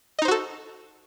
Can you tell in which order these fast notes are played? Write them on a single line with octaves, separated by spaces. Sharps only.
D#5 D#4 C5 F#4 A4